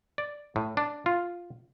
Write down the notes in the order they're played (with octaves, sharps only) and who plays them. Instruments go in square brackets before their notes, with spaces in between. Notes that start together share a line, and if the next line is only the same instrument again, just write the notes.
[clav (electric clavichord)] D5
A2
D4
F4